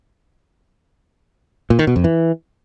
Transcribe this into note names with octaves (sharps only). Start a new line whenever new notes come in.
A#2
D#3
B2
F2
E3